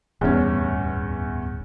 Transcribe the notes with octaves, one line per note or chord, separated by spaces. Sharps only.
D1 E2 G2 C#4